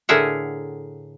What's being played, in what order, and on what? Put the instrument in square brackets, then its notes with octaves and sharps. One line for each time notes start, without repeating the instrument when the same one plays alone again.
[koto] A2 D3 G#4 A#4 E5 F#5